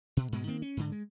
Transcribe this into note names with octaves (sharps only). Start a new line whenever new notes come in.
B2
G#2 B2 G#3
D#3 A#3 C4
C#4
G#2 D3
G#3